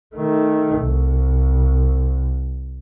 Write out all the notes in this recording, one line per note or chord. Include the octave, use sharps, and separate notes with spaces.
D#3 A3
C2